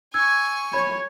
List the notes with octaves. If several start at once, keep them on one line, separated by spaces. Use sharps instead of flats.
G#5 C#6 E6 G#6
C#5 B5